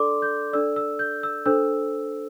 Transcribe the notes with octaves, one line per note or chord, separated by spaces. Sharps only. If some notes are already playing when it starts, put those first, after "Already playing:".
Already playing: D4 A4 D5 C6 D6
G6
D4 A4 D5 E6
E6
G6
E6
D4 A4 C5 E6